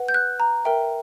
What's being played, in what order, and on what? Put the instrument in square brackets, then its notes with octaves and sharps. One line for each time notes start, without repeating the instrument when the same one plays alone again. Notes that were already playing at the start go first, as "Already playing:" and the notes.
Already playing: [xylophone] B4 F#5
G6
F#6
A#5
A#4 E5 G5